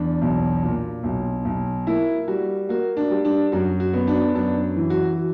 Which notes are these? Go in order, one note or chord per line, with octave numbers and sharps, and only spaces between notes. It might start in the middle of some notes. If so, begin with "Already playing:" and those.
Already playing: E2 D4
B1
A#2
B1
B1
A#3 E4
G3 F#4
A#3 F#4
D4
G3
D4
F#2 F#4
F#4
B3
D4
F#2 D4
E3
F#4